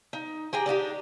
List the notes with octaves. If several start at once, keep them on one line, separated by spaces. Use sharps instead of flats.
D#4
G4 G#4 G5 A#5
D4 D#4 F#4 G4